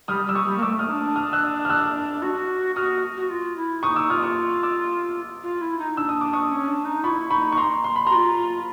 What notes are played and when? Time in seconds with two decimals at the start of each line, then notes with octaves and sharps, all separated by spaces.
0.08 G3 D#6 F6
0.26 G3 E6
0.35 C#6 D#6
0.44 G3
0.58 A#3
0.62 A3 D6 E6
0.79 D#6 F6
0.88 D#4
0.92 D4
1.16 D#6 F6
1.33 E6 F#6
1.65 F6
1.70 E6 F#6
2.22 F#4
2.75 F#4 D#6 F6
3.17 F#4
3.30 F4
3.57 E4
3.83 D#4 C#6 D#6
3.96 D6 E6
4.10 F4 D#6 F6
4.22 C#6 D#6
4.63 D6 E6
5.43 F4
5.61 E4
5.78 D#4
5.96 D4 E6
6.09 D#6
6.21 D6
6.33 C#6 D#6
6.51 C#4
6.67 D4
6.85 D#4
7.04 E4 F4 B5 C#6
7.30 D#4 B5 C#6
7.52 C#6
7.57 A#5 C6
7.84 C6
7.96 B5
8.07 F#4 A#5 C6
8.15 F4